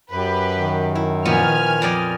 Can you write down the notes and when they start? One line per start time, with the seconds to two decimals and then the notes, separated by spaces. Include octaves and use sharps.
0.11 F#2 G4 B4
0.55 D#3
0.95 E4
1.25 A#2 F3 B3 G#5 F6
1.82 F2 D5 D#5